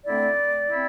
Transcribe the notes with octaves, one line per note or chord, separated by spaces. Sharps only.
D3 A3 C4 E4 D5
C4 E4